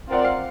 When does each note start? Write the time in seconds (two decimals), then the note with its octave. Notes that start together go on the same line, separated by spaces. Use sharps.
0.08 C4 F4 A#4 D5 F#5
0.25 F5